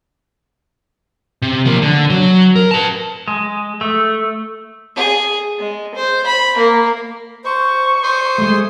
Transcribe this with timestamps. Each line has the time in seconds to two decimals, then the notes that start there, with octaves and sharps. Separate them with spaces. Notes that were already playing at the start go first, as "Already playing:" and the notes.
1.42 C3
1.65 F3 A#3
1.82 D3
2.10 F#3
2.56 A#4
2.71 B4 A5
3.28 G#3
3.81 A3
4.96 G#4
5.59 G#3
5.94 C5
6.26 B5
6.57 A#3
7.45 C5 C#6
8.03 C5 D#6
8.38 G#3 A3